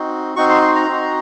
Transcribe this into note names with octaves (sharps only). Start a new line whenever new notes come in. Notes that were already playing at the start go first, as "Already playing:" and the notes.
Already playing: C4 D#4 F#4
C4 D#4 F#4 C#6
C6
C6
A#5
C4 D#4 F#4